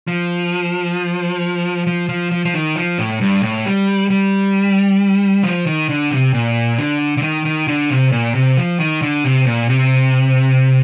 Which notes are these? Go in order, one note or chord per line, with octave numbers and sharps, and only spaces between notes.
F3
F3
F3
F3
F3
D#3
F3
A2
G2
A2
G3
G3
F3
D#3
D3
C3
A#2
D3
D3
D#3
D#3
D3
C3
A#2
C3
F3
D#3
D3
C3
A#2
C3